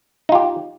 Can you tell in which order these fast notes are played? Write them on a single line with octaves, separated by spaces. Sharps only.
D#4 F4 G4